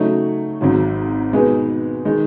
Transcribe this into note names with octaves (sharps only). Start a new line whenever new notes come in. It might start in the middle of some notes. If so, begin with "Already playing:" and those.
Already playing: C#3 F#3 A3 D#4
G#1 G#2 F#3
B2 G#3 D#4 G#4 B4
D#3 G#3 D#4